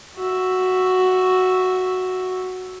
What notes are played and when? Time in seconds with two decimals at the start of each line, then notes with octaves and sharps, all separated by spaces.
0.16 F#4 E5